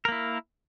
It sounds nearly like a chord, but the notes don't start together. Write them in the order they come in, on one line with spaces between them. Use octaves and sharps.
A#4 A#3 E4